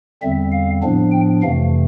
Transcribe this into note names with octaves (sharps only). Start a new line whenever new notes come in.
E2 D3 G3 C4 E5
F5
A2 F3 B3 D4
G5
F2 C3 E3 A3 F5